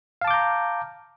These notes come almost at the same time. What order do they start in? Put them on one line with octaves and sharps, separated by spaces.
F5 A5 D6 G6 A#5